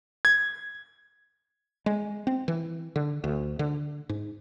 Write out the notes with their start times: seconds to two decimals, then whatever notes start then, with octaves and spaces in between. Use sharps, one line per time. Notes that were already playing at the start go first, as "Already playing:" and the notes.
0.25 G#6
1.86 G#3
2.27 C4
2.48 E3
2.96 D3
3.24 D2
3.59 D3
4.09 G#2